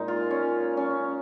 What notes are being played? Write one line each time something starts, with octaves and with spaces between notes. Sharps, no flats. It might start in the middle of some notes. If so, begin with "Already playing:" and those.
Already playing: A#2 G#3 D#4
F4
C#4
C#4